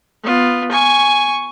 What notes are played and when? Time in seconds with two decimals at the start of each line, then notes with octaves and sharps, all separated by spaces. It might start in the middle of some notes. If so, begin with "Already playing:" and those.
0.23 B3 F4
0.71 G#5 C#6